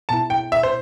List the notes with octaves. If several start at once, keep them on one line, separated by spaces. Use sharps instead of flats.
B2 B3 E4 A5
G5
E5
C5